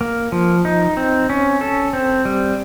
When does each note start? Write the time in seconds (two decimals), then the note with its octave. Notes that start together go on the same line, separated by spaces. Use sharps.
0.01 A#3
0.32 F3
0.65 D#4
0.97 C4
1.30 C#4
1.61 A4
1.93 C4
2.25 G3